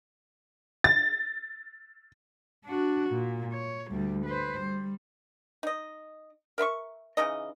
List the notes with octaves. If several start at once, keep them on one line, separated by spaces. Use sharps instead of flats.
A6
D4 F#4
A#2
C#5
D2 G3
B4 C5
G3
D#4 D#5
A#4 E5 B5 C#6
C#3 E3 D#4 D#5